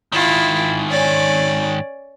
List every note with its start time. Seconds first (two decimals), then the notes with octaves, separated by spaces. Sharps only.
0.12 G#2 D#3 E4 F4
0.90 C#4 D5